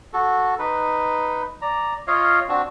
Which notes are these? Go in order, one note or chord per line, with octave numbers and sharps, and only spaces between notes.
F#4 A4
D#4 B4
D5 A#5
F4 C#5 D#5 F5
C4 D4 F#4